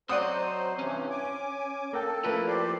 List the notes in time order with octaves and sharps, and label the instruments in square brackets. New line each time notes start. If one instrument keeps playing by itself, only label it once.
[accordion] F#3 C5 [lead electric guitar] C4 D#5 [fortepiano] D5 F#5 D#6
[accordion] G2 C3 E3 [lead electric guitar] C#4
[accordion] G#5 D6
[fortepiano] A#3 G5 [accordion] A4
[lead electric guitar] F3 E4 [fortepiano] A3 A#3 B4
[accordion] G4 C5 D5